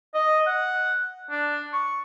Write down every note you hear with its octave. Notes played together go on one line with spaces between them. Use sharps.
D#5
F#5
D4
C#6